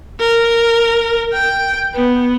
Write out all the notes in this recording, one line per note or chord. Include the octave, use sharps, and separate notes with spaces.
A#4
G5
B3